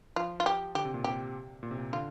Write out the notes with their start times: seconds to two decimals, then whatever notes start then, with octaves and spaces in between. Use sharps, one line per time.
0.16 F3 F4
0.40 F4
0.46 G4
0.75 D3 G4
0.85 C3
0.94 A#2
1.04 C3 G4
1.63 A#2
1.71 C3
1.78 A#2
1.93 D3 F4